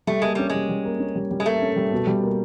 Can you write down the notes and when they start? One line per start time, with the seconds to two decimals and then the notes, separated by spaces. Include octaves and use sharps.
0.07 G3 A3
0.22 G#3 A#3
0.35 G3 C#4
0.50 G3 G#3
0.69 G3
0.85 A#3
1.00 C#4
1.15 G3
1.31 G3
1.40 G#3
1.45 A3 A#3
1.62 C#4
1.76 G3
1.92 B2
2.07 G3
2.23 A#3